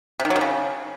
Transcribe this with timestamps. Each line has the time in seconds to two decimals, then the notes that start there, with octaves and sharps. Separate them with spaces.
0.20 C3
0.25 D#3
0.30 F#3
0.36 D#3
0.41 C#3